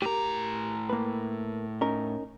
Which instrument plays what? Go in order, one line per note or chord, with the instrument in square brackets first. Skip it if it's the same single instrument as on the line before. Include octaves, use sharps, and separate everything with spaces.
[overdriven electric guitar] A2 A#5 [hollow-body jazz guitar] G4 A#4
[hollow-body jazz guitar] A#3 B4
C#4 D#4 A#4